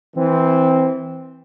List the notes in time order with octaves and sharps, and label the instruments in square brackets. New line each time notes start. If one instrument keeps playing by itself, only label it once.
[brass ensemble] E3 C4